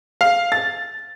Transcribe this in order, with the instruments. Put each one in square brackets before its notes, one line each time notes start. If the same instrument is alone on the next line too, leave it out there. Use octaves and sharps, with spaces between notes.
[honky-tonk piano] F5
A6